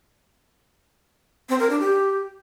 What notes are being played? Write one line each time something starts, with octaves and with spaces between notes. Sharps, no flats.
C4
A#4
D4
G4